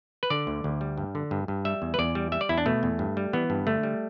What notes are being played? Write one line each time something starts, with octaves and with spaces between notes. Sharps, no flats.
B4
D3 D5
D2
D2
G3
G2
D3
G2
G2
G3 E5
E2
B4
E2 D5
G3
G3 E5
D5
E2 E4
D4
B2 A3
E2
G2
G3
E3 B3
G2
D3 A3
G3